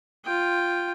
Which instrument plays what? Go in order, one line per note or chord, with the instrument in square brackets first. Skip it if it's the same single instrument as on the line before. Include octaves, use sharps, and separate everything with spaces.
[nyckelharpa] F4 G5